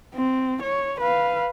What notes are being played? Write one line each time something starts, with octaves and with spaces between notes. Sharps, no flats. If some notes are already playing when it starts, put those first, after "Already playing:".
C4
C#5
B4 F5